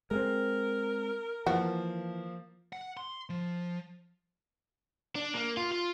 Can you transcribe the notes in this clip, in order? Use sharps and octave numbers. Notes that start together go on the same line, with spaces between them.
G#3 A3 C4 A#4
E3 F3 A#3 F#4
F#5
C6
F3
D4
A#3
F4
F4